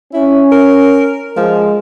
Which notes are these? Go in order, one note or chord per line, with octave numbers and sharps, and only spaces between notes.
C#4 E4
A#4
F3 G#3